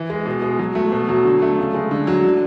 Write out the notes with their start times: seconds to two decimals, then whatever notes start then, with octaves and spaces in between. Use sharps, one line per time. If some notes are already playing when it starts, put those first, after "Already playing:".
Already playing: E3
0.10 G#3
0.26 B2
0.42 G#3
0.59 F#3
0.75 A3
0.92 B2
1.09 F#3
1.25 D3
1.42 A3
1.58 C#3
1.74 G#3
1.91 D3
2.07 F#3
2.24 D3